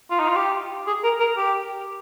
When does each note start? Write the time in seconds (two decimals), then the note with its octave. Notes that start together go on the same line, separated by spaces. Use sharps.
0.11 F4
0.20 D#4
0.28 F4
0.36 G4
0.87 G#4
1.04 A#4
1.20 A#4
1.37 G4